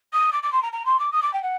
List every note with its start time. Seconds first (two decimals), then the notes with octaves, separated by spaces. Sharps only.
0.13 D#6
0.32 D6
0.43 D6
0.52 C6
0.62 A#5
0.72 A#5
0.85 C6
0.99 D6
1.12 D#6
1.22 D6
1.33 G5
1.42 F#5